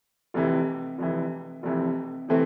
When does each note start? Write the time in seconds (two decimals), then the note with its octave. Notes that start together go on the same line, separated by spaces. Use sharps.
0.34 F1 F2 E3
0.98 F1 F2 E3
1.63 F1 F2 E3
2.28 C3 E3 A3 C4